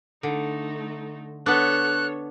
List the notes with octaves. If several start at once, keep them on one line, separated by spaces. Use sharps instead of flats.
D3 A3 D#4
B3 D4 A4 C#5 F#6